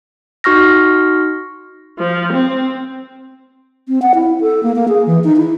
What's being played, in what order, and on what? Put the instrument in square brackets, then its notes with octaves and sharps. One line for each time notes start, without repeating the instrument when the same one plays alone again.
[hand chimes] D#4 F#4 C#6 F6 A#6
[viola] F3
C4
[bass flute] C4
F#5
E4
A4
A#3
A#3
G#4
E3
D#4
E4